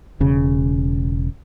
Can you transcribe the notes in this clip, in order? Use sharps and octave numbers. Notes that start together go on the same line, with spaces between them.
E1 C#3